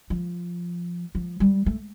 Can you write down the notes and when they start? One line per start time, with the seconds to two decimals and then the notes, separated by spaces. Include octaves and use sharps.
0.10 F3
1.15 F3
1.40 G3
1.66 A3